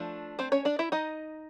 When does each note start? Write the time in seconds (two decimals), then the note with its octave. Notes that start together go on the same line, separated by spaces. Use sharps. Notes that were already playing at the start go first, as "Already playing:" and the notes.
Already playing: F3 A3 D4
0.39 C4 C5
0.52 C#4 C#5
0.65 D4 D5
0.79 E4 E5
0.92 D#4 D#5